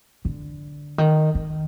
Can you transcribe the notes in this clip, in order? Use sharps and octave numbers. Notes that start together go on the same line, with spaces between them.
D3
D#3
D#3